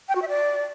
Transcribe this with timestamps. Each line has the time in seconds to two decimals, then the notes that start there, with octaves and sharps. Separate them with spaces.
0.09 G5
0.15 F#4
0.22 E5
0.29 D5